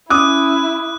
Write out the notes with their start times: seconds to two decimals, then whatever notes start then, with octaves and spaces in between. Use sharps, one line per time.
0.10 C#4 E4 D6 D#6 F#6